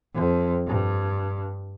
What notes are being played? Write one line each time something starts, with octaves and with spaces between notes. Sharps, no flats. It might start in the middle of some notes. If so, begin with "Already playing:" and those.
F2
G2